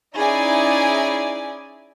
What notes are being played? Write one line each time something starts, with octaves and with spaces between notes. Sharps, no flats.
C#4 D#4 E4 G#4 D5 G#5